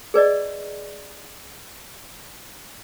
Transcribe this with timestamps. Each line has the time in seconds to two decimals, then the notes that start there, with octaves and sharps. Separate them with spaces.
0.14 G#4 B4 D5 D#5